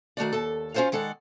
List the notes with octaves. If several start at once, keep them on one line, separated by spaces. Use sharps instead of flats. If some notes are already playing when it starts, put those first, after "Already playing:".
D#3 A3 F#4 D5
D#2 A4
C#4 F4 A4 C5 C#5 F5
D#3 G#3 A4 D5 F#5